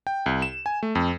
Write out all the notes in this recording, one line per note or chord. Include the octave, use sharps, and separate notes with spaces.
G5
C2
E7
G#5
A3
F2